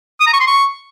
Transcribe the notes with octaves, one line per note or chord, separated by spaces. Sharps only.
D#6
A#5
C#6
C6
C#6